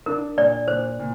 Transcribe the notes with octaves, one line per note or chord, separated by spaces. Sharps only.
D4 A#4
A#2 D5
A#2 C5
A#2